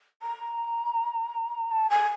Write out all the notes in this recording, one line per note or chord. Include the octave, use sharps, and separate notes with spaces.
A#5
A5
G#5